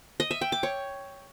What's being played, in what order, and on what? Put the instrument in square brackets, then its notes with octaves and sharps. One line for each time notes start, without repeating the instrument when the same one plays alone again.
[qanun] D#5
E5
G5
D6
C#5